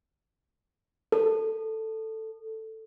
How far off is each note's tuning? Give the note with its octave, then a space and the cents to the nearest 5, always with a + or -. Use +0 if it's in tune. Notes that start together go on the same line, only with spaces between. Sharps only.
A4 +5